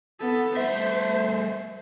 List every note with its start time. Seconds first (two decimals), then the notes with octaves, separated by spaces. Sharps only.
0.20 B3 A4
0.57 G3 A3 C5 E5